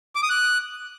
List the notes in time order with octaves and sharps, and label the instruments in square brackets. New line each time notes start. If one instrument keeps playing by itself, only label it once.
[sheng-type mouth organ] D6
D#6
F#6